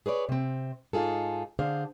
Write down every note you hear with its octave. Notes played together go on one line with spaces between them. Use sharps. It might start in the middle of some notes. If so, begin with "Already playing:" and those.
G#4 B4 C#5 D5
C3 C4
G#2 D#4 F4 G#4 A4
D3 D4 G#4 C5 F5